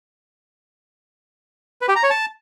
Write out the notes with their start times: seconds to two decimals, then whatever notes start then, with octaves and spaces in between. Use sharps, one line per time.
1.81 B4
1.89 G4
1.96 A#5
2.03 C#5
2.10 A5